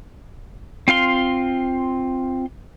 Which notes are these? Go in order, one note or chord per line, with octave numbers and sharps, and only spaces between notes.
C4 F4 F5 C6